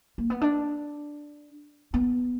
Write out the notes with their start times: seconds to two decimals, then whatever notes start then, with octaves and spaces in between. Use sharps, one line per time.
0.18 A#3
0.30 B3
0.41 D4
1.94 B3